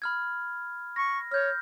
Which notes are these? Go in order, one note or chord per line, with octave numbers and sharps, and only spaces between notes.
B5 F6 G#6
C#6 A#6
C#5 F6 G6